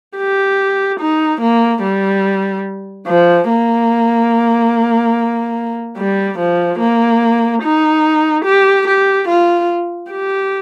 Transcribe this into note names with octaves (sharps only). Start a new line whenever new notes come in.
G4
D#4
A#3
G3
F3
A#3
G3
F3
A#3
D#4
G4
G4
F4
G4